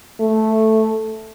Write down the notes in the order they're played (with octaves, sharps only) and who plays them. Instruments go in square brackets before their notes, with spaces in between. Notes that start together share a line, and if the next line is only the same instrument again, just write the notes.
[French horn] A3